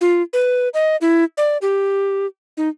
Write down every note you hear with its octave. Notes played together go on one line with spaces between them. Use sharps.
F4
B4
D#5
E4
D5
G4
D#4